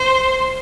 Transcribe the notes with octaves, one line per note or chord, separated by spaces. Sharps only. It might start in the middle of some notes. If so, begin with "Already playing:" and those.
Already playing: C5